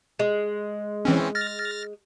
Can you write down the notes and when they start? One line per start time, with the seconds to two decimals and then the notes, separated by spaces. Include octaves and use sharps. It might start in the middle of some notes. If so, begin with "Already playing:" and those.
0.19 G#3
1.05 E3 C4 C#4
1.35 F6 A6 A#6